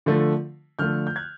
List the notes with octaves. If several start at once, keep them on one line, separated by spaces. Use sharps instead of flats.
D3 F3 A3
D3 F3 A3 F6 G6
G6
F#6 G#6